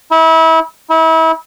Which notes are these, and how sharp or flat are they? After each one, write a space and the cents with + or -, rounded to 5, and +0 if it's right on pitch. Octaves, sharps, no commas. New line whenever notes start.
E4 -30
E4 -35